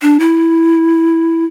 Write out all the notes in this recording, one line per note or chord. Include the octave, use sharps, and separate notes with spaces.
D4
E4